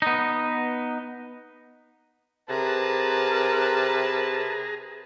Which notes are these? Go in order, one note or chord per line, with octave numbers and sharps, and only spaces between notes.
B3 D#4
C3 G#4 A#4 B4 A5 A#5